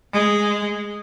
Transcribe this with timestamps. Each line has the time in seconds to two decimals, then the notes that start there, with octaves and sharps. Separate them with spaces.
0.13 G#3